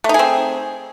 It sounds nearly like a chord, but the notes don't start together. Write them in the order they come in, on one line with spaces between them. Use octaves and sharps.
A3 D#4 G#4 C4